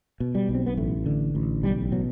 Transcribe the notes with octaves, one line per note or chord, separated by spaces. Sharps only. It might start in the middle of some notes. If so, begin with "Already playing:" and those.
B2
G3
B1
C4
B3
A1 A3
D3
A1
B1 G3
B2 F#3